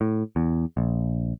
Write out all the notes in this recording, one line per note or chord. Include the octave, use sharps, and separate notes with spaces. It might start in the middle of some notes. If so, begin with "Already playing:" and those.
A2
E2
A#1